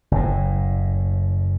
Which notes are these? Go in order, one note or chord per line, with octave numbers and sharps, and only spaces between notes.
F#1 A2